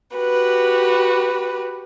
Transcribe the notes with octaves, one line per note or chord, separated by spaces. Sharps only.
F#4 G4 B4